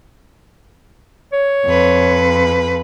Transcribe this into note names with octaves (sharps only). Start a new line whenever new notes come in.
C#5
F2 B4